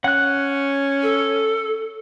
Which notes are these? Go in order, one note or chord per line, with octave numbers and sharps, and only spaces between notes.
C#4 F#5 F#6
A4